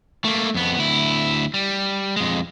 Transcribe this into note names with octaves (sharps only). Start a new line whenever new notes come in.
A3 A#3
F2 B3
D2 E4
G3
F2 G#3